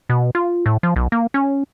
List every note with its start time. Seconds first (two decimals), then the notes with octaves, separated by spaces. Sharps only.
0.09 B2
0.35 F4
0.66 A2
0.83 F3
0.96 B1
1.12 A#3
1.34 C#4